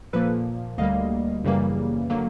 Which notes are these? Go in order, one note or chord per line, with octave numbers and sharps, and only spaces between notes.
A#2 F3 A#3 A4 B4
D2 D3 G3 A#3 D#5 F5
F#2 C#3 E3 G3 A#3
D3 F#3 A#3